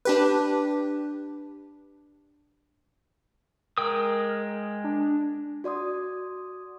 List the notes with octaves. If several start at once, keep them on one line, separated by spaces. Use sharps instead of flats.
D4 G4 B4
G#3 A#4 G5 D#6
D4
F#4 D5 C6 D#6